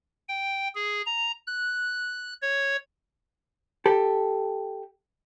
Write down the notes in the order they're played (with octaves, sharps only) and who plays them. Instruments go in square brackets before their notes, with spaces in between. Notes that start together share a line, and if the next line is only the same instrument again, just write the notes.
[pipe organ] G5
G#4
A#5
F#6
C#5
[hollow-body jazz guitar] G4 A4